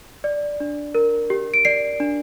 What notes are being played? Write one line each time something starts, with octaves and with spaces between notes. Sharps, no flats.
D5
D4
A#4
G4
D7
D5 C7
D4